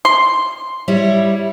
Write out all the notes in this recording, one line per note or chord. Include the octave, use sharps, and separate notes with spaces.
C6
G3 E4 C#5